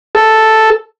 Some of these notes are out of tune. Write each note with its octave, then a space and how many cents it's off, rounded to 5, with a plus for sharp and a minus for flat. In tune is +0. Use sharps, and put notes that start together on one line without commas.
A4 +0